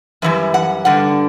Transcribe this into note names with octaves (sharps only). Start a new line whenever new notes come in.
F#2 E3 G3 E5
F#5
G2 D3 G3 F#5